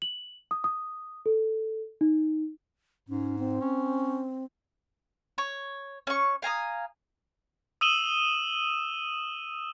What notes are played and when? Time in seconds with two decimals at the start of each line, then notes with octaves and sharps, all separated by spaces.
0.02 F#7
0.51 D#6
0.64 D#6
1.26 A4
2.01 D#4
3.09 G#2 C#4
3.39 C4
3.61 C#4
5.38 C#5
6.07 C#4 C#6
6.42 F5 G#5 A#5 D#6
7.81 D#6 E6 D#7 E7 F#7 G7